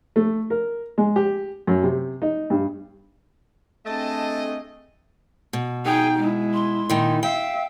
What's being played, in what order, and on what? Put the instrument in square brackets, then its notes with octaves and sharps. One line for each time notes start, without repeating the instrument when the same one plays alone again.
[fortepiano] A3
A#4
G#3
G4
F#2
C3
D#4
G2
[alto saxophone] A3 [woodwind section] C4 D4 [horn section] G4 G#4 D#5 [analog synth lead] A5
[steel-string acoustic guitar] B2
[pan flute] D#4 [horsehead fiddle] G#4 G5
[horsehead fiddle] G#3 E4
[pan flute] C6
[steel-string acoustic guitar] A#2 D#3 D#4 [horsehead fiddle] E4
[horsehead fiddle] E5 [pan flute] F5 [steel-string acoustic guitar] G5